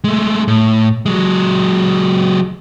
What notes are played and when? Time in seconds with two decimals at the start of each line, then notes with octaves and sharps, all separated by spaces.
0.04 G#3 A3
0.48 A2
1.06 F#3 G#3